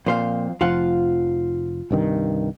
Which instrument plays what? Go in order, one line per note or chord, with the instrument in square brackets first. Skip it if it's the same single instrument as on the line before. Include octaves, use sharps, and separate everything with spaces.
[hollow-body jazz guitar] F2 C5 F5 [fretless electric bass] A#2
[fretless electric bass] F1 F3 [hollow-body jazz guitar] F4 F5 F#5
[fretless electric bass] C2 G2 D#3